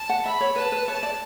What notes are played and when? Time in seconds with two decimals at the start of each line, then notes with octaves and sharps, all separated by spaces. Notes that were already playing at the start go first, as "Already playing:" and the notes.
Already playing: A5
0.09 F#5
0.25 E5 B5
0.41 C#5
0.56 B4 A5
0.72 B4
0.88 C#5 A5
1.03 D5